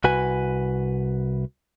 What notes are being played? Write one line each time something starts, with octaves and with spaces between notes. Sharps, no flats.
C2 F#4 B4 G#5